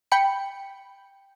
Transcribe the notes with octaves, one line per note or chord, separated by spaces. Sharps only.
G5 B5 C#7